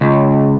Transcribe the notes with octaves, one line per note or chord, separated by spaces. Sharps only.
C#2